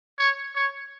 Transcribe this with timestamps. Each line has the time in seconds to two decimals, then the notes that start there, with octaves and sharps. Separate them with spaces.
0.19 C#5
0.56 C#5